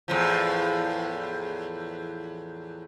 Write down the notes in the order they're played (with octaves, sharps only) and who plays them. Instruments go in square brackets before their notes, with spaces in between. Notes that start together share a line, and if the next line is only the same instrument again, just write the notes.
[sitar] E2 A2 F3